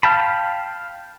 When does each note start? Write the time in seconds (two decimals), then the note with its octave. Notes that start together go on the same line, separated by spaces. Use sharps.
0.03 F5 G5 A5 B5